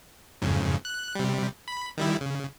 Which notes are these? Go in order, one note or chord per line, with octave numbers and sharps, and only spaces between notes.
F2 G#2 C#3
F#6
C3 G3
B5
D#3 G3 E4
C#3